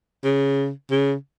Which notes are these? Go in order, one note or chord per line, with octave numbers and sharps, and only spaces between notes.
C#3
C#3